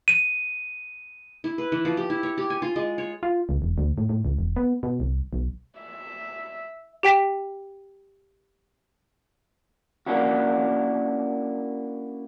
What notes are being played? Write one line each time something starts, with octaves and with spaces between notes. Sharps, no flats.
D#7
E4
B4
E3
F3
G4
E4
C#5
G4
G#5
F4
G#3
C#5
F4
C#2
E1
D2
A2
A2
C#2
E1
B3
B2
C2
B1
E5
G4 G5 B6 E7
A#3 C#4 D4 E4 F#4